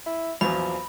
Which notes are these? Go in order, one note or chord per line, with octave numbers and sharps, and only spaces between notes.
E4
A#1 E2 F3 F#3 B5